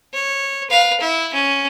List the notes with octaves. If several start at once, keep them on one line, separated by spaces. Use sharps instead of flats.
C#5
B4 F5
E4
C#4